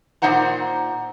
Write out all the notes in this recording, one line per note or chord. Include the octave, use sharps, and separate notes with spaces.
A#2 B3 D#4 C5 F#5 A#5